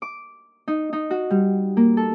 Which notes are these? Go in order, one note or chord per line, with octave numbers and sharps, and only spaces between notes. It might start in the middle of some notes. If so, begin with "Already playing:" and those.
D6
D#4
D#4
F#4
G3
A#3
A4